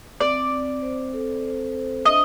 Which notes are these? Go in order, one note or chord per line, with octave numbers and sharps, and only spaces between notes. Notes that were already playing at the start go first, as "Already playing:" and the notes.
C4 D5
C4
C5
A4
C5
C5
D4 D#5